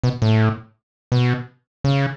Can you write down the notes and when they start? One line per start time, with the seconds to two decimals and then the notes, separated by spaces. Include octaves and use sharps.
0.04 B2
0.22 A2
1.12 B2
1.84 C#3